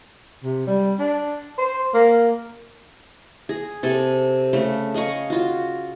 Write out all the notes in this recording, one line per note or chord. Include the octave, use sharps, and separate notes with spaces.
C3
G3
D4
C5
A#3
G#4
C3 A4 G#5
C#3 A3
G#4 D#5 F5 C#6
F4 F#4